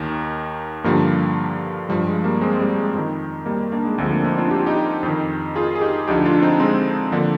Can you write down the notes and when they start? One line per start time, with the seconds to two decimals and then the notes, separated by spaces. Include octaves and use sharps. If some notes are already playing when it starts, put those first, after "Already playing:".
Already playing: D#2 D#3
0.84 G2 D3 F3 G3 A#3
1.89 G2 F3 G3
2.07 G#3
2.24 G3 A#3
2.41 G#3 C4
2.53 G#3
2.59 G3
2.76 G#3
2.94 F2 D#3
3.46 G3 A#3
3.72 A#3 D4
3.85 G#3
3.98 D2 D3 F3 G#3 C4
4.11 A#3 D4
4.25 C4 D#4
4.38 D4 F4
4.51 G4
4.59 F4
4.66 D#4 G4
5.03 F2
5.08 D#3
5.55 F4 G#4
5.75 G#4
5.81 D#4 G4
6.08 D2 D3 F3 D#4 G4
6.25 D4 F4
6.42 C4 D#4
6.60 G#3 C4
7.12 D3 F3 A#3 D4